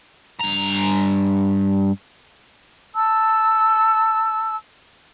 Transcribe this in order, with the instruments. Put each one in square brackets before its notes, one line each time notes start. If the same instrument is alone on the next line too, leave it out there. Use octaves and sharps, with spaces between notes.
[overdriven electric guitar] G2 A#5
[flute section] A5 E6